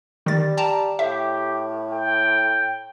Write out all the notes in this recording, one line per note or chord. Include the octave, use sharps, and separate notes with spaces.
D#3 G3 A6
G5 A5 A#5
A2 G4 E5
G5